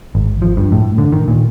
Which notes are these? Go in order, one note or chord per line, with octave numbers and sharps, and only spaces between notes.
G#1
F3
G2
A2
D3
D#3
A#2